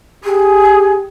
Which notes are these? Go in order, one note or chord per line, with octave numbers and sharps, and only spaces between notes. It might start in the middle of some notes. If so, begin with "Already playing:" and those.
G4 G#4